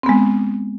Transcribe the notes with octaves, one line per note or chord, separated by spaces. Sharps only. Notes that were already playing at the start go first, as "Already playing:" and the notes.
G#3 B3 C4